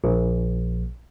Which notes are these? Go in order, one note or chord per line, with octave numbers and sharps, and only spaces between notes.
A#1